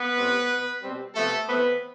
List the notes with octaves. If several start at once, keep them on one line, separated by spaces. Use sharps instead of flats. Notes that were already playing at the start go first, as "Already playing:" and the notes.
Already playing: B3 B4
A2 G3 C4
B2 B3
B2 G3 C4
C3 F3 A3 B3 A4
E3 A3 B3 C4 B4